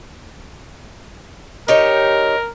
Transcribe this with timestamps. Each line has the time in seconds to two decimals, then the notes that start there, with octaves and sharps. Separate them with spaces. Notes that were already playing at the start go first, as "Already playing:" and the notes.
1.68 D#4 G4 A#4 C#5